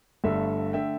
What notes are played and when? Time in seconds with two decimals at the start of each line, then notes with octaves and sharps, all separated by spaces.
0.24 G1 G2 D3 A3 E5
0.73 D3 A3 E5 G5